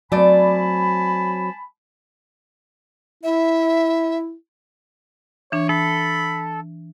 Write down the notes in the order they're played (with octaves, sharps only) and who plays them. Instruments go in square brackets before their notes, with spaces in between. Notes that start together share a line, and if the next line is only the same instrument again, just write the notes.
[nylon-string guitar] F#3 C4 [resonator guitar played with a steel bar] A3 D5 [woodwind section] G#5 A5 B5
[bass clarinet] E4 [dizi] E5
[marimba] E3 D4 [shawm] C#5
[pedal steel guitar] A4 [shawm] B5